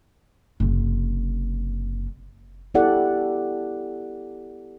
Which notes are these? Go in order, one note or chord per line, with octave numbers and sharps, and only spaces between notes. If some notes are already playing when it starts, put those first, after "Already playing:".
F#1 C3
B3 E4 G4 A4 D5 F#5